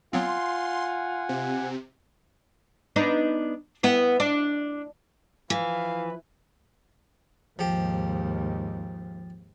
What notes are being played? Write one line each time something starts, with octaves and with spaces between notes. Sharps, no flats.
F#3 B3 C4 F4 F#5 G#5 C6
C3
B3 D4 D#4
B3 E4
D4
E3 F3 B4 F5
D#2 G#2 F3 G4